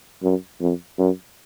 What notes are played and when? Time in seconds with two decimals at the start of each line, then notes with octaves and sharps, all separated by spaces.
0.23 F#2
0.60 F2
0.98 F#2